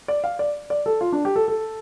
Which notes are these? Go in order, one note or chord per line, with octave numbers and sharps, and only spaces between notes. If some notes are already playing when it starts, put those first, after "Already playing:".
D5
F5
D5
D5
A4
F4
D4
G4
A4
A4